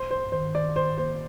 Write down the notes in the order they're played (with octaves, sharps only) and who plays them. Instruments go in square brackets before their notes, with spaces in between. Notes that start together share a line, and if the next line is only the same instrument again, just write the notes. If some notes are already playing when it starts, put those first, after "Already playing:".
Already playing: [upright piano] C5
[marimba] G2 [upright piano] C5
[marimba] D#3 [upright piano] C5
[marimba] D#3 [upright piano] D5
[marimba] D#3 [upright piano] C5
[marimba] A#3 [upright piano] C5